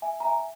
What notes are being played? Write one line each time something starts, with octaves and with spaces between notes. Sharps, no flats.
E5 G#5
A#5
E5 G#5